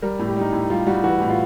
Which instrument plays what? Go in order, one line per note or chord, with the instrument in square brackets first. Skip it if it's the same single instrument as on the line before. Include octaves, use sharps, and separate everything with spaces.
[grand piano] G3 [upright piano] A#4
[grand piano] A2
[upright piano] G4
[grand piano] G3 [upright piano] D#4
[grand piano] A2
[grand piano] G3 [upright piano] F4
[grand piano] G3 [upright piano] F#4
[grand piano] E3 [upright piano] F#4
[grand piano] A2
[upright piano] F4